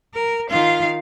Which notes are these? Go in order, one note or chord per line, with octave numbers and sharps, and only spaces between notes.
A#4
D#3 F4 F5